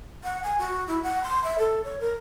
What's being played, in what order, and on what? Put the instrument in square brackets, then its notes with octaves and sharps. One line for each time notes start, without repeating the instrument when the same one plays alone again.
[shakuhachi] F#5
G#5
F#4
E4
F#5
C6
E5
A4
C#5
A#4